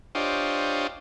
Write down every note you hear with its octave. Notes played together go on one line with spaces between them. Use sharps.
D4 F4 G4 C5 C#5 D#5